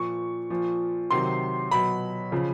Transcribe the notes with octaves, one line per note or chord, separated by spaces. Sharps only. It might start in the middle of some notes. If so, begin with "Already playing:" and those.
Already playing: A#2 F3 C#6
A#2 F3
C3 D#3 F#3 C6
B2 F#3 B5
C#3 F3